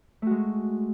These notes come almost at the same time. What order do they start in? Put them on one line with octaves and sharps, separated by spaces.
A3 F#4 G#3